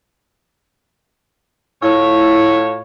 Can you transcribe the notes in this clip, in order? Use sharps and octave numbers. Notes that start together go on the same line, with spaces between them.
A2 E4 F4 C#5 E6